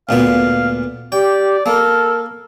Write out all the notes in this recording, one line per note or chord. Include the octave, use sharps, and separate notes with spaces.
D2 A#2 B3 F5
G4 D5 G5
A#3 A4 A#4